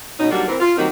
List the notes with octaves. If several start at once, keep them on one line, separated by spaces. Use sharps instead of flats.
B2 C#4 D#4
G#2 F#3 G3 A#3 D4 F#4
E3 C4 A#4
F4
D#3 F#3 G3 A#3 C4 D#4